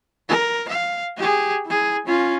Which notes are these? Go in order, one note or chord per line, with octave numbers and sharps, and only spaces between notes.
A#4
F5
G4 G#4
E4 G#4
C#4 F4